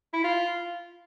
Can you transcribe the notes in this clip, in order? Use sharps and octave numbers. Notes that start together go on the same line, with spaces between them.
E4
F4